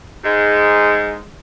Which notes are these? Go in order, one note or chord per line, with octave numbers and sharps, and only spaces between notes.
G#2 G#3